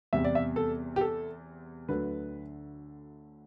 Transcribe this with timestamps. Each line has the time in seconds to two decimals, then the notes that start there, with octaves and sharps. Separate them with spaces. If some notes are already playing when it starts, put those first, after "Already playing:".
0.13 E2 C3 G3 E5
0.24 D5
0.35 E5
0.56 A4
0.96 G4
1.01 A4
1.89 D2 D3 F#3 A3 B4